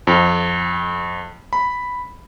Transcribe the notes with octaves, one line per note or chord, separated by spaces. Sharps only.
F2
B5